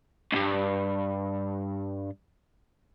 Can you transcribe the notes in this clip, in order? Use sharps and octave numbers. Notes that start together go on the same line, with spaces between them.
C#2 G2